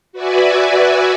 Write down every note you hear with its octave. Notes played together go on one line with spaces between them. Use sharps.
F#4 B4 D5 E5 G#5